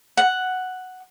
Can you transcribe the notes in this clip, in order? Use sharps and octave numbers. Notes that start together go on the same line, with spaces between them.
F#5